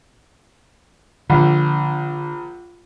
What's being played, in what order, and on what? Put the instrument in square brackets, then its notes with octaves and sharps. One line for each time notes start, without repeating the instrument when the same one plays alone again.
[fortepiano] A#1 [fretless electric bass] D3